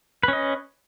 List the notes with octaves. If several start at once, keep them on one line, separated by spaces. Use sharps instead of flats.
C#4 B4 D#5